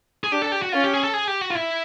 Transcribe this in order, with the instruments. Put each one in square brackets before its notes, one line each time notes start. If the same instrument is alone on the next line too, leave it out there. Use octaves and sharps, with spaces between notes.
[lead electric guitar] G#4
[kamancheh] D4 [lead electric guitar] G4
[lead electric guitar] A4
G4
F#4
[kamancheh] C#4 [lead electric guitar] F4
[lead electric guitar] G4
G#4
A4
G#4
G4
F#4
F4
E4